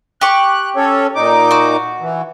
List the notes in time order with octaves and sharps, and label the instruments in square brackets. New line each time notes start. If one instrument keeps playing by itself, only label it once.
[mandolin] G4 C#6 [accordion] F#6
[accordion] C#4 A4 C#5
A#2 D#4 D6
[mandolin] F#4
[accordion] E3